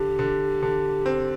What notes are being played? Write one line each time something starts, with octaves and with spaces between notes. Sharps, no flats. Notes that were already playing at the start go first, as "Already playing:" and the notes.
Already playing: D3 G4
D3
D3
C4